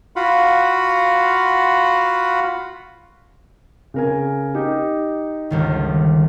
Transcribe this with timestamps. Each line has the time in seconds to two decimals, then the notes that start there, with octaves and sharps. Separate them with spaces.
0.16 F4 F#4 F5 F#5 B5
3.94 C#3 A#4 G#5
4.55 D#4 G4
5.50 G1 C#2 D#3